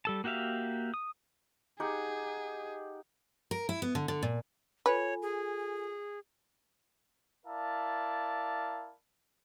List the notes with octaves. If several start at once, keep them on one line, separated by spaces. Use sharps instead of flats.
G3 A4 A5
A#3 F#4 G4 E5 F5
D#6
D#4 G4 G#4 F#5
A#4
E4
B3
D3
D3
A#2
F4 A4 B4 C#5 G#5
G#4
E4 A#4 D5 F5 A5